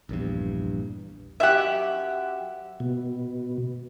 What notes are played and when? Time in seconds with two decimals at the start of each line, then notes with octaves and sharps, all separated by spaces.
0.09 A#1 E2 G2
1.40 F#2 G4 E5 F#5
2.80 B2